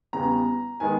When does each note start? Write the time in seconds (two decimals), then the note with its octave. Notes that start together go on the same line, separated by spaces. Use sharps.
0.13 E2 C#3 G3 B3 A#5
0.80 D#3 G#3 B3 G#5